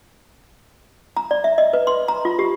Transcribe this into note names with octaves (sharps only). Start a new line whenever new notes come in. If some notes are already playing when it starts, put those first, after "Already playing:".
A#5
D5
E5
D#5
B4
C6
A#5
F4
G4